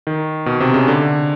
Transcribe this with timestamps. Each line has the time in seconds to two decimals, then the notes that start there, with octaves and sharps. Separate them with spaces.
0.07 D#3
0.46 B2
0.60 C3
0.74 C#3
0.88 D3